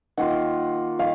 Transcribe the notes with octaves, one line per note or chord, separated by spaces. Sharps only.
D#3 A#3 F4 F#5
D#3 F5